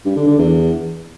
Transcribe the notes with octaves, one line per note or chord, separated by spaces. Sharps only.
G2
D3
D3
E2